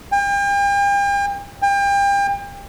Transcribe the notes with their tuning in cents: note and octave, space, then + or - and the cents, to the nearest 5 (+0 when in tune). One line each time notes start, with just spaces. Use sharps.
G5 +40
G5 +35